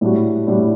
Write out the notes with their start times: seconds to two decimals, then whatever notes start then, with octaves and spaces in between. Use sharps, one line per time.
0.01 A2 G3 D4 F#4
0.47 A2 G3 D4 F#4